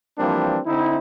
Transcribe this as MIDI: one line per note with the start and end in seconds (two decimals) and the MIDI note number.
0.18 0.58 52
0.18 0.58 53
0.18 0.58 55
0.18 0.58 58
0.18 0.58 60
0.18 0.58 62
0.66 0.97 50
0.66 0.97 60
0.66 0.97 63
0.66 0.97 64